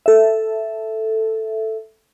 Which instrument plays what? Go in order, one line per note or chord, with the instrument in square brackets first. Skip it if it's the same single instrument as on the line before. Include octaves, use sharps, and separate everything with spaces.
[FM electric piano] A4 E5